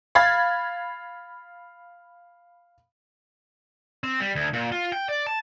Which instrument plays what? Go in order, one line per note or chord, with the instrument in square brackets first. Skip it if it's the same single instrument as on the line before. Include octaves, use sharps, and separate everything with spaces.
[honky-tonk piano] F5 B5 G#6 A6
[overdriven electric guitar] C4
G3
D2
A#2
F4
G5
D5
A5